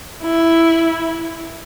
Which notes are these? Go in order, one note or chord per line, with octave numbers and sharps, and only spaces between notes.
E4